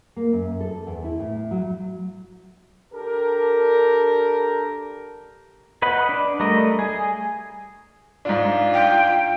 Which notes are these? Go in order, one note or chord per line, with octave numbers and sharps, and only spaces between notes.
A#3
F#2
A4
E2
E4
A2
F#3
D4 G4 A4 A#4
B4 D#5 F#5 B5
D4
G3 A3 A#4 D#5
G#4
G#2 D4 F4
G5